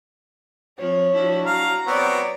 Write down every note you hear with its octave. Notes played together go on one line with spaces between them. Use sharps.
F3 C4 C#5
F3 D4 E4 F#4
F#3 F5 A#5
B3 C4 F#4 C#5 D5